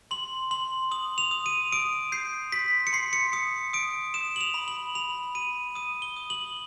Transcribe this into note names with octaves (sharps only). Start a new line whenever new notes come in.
C6 F#7
C6 F#7
D#6 F#7
F7
D#6
D#7
D#6 D7
G6 C7
C6 B6
C#7
C6 C7
C#7
D#6 C#7
D#6 D7
D#6 E7
F#7
F7
B5
F#7
B5 F7
B5 D#7
D#6 D#7
G7
D#6
F#7